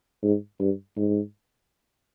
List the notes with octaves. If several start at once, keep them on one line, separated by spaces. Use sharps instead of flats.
G#2
G2
G#2